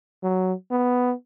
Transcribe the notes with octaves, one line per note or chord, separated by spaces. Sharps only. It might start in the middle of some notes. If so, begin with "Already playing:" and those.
F#3
B3